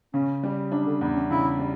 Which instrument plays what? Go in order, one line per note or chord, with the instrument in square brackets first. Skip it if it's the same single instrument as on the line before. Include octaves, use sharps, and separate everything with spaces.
[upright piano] C#3 [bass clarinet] C#4
[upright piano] G3
[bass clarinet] F#3 [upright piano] D4
[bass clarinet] D3
[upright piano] E2 [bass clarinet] B3
[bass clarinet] C#4
[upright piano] C#3 [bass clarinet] E4
[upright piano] G3